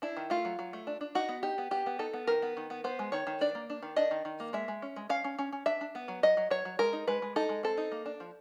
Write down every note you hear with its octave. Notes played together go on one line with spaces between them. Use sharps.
D4 E4
D#3
A3 F4
F#3
F#3
A3
D4
D4
D#4 F#4
B3
D#4 G4
B3
B3 G4
B3
D#4 A4
B3
D#3 A#4
B3
D#3
B3
B3 C5
G#3
D#3 C#5
D#3
D4 D5
A#3
D4
D#3
D4 D#5
D#3
D#3
A#3
G#3 E5
G#3
C#4
G#3
C#4 F5
C#4
C#4
C#4
D4 E5
D4
B3
F#3
F#3 D#5
F#3
F#3 C#5
F#3
G#3 A#4
D#4
G#3 B4
G#3
D#4 A4
G#3
C4 A4
D#4
A#3
D4
F3